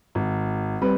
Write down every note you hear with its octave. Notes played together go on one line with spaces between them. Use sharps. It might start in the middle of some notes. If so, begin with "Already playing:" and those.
G#1
G3 C4 B4